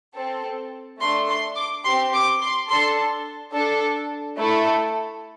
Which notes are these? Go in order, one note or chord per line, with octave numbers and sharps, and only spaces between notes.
C4 A4
A3 D4 A4 C6
C6
D6
C4 G4 C6
D6
C6
D4 A4 C6
D4 A4
A3 E4 A4